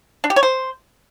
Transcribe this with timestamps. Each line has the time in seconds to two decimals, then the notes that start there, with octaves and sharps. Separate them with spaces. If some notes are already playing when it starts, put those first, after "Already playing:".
0.24 D4
0.30 G4
0.36 C#5
0.43 C5